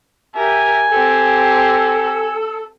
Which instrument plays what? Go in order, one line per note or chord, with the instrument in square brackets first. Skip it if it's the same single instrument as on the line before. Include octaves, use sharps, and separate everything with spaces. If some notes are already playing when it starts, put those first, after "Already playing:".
[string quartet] G4 A#4 E5 [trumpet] G#5
[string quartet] C4 G4 [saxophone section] A4